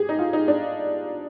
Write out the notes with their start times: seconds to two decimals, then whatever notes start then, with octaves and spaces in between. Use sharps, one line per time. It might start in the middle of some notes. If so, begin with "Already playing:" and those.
Already playing: G4 G#4
0.09 D#4
0.19 F4
0.33 D#4
0.48 D4